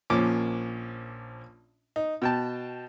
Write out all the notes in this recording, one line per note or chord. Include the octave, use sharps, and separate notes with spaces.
A#1 A#2 F3 C#4 D6
D#4
B2 G5 A5